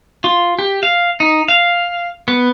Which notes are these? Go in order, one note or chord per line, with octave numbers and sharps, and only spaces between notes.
F4
G4
F5
D#4
F5
B3